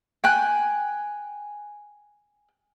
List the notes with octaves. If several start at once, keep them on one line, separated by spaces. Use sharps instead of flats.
G5 G#5 F#6